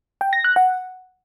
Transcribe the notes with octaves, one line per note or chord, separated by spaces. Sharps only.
G5
A#6
F#6
F#5